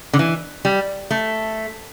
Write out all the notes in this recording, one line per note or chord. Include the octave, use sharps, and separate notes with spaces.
D3
E3
G3
A3